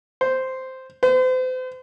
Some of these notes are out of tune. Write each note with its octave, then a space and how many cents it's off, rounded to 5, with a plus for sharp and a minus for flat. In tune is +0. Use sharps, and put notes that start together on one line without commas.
C5 -5
C5 -40